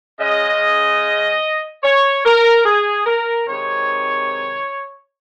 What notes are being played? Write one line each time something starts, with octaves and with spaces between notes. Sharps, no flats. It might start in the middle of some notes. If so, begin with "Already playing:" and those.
C#3 G#3 C#4 D#5
C#5
A#4
G#4
A#4
C3 D#3 G#3 C4 D#4 C#5